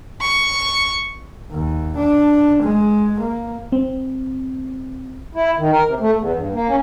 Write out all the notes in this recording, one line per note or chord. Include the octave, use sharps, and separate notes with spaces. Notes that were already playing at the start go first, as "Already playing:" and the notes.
C#6
D#2
D4
G#3
A#3
C4
E4
D#3
A#4
C3
A3
E2
G2
A#3
C#4